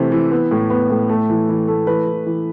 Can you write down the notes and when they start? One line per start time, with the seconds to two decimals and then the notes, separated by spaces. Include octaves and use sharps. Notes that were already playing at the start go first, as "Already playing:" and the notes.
Already playing: C3 E3 A3
0.12 E3
0.32 B3
0.51 A2
0.70 B3
0.90 A2
1.09 A3
1.30 E3
1.49 E3
1.68 A3
1.87 E3 B4
2.07 E3
2.27 E3